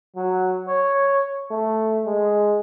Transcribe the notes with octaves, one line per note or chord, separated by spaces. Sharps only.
F#3
C#5
A3
G#3